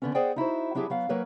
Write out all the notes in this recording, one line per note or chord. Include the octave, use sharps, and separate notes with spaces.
D3 B3 C#4
G#4 C5 D5 D#5 F#5 G5
D#4 E4 F#4 C5
F#3 D4 E4 G4 G#4
F#3 B3 F5
F#3 A#3 A#4 B4 C#5